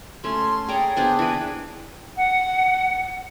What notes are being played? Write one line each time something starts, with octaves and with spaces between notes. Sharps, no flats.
A3 C#4 C6
G#4 C#5 D5 G5 A#5
B3 D4 G#4 C5
E3 B4 G5
F#5